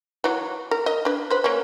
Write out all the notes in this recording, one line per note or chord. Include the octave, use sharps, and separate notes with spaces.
E3 F#3
A#4
D#5
D4 B4
B4 C5
A#3 C#4